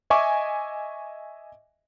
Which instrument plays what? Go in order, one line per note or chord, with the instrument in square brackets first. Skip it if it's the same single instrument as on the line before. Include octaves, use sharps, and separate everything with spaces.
[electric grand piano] D#5 E5 G#5 C#6 D6